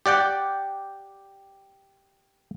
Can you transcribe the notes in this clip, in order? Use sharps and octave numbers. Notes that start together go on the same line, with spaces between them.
G4 D5 F#5 G5